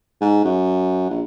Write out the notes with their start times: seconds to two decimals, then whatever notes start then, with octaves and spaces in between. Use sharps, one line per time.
0.21 G#2
0.44 F#2
1.10 A#1